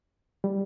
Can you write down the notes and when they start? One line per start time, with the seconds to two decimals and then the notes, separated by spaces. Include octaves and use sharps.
0.44 G3